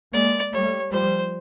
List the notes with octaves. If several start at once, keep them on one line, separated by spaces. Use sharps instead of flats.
G#3 A#3 D5
G3 A3 C#5
F3 G3 C5